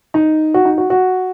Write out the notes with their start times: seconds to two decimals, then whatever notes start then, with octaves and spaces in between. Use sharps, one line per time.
0.14 D#4
0.54 F#4
0.65 D#4
0.78 F#4
0.90 F#4